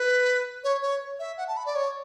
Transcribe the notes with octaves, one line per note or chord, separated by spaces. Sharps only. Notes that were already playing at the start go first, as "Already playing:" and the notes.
Already playing: B4
C#5
C#5
E5
F#5
A5
B5
D5
C#5